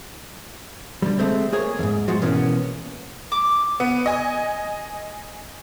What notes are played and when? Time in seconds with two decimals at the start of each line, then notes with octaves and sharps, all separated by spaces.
1.02 D3 G3
1.19 G#3 A3 C4
1.52 A#3 G#4 C#5
1.79 E2 G#2
2.08 F3 G#3 F#4
2.22 B2 E3 A#3 B3 C#4
3.32 D6
3.80 B3
4.06 D#5 G#5